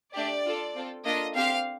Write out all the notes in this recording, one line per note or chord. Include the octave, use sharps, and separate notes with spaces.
A3 D4 G4 D5
D4 F4 A4
C4 F4 A4
A#3 D4 F4 A4 D#5
C4 G4 F5